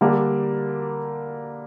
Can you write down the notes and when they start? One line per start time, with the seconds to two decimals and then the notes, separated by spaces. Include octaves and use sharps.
0.01 D3 G3 A#3 D4 G4